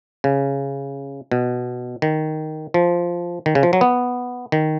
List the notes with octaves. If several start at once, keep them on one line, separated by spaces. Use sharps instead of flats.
C#3
B2
D#3
F3
D#3
C#3
F3
F#3
B3
D#3